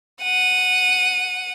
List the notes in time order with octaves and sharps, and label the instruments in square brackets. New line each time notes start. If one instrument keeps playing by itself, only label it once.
[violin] F#5 D#7